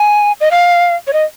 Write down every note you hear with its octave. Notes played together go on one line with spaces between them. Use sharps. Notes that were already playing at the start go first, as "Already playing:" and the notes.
Already playing: G#5
D#5
F5
C#5
D#5